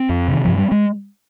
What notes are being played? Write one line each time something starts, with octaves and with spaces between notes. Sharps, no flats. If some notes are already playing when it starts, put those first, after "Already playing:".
Already playing: C4
F2
C3 D#3
G2 F3
G3
G#3